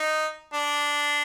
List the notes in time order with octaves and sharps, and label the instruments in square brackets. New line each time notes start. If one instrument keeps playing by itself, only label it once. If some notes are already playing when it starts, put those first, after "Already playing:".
Already playing: [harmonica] D#4
D4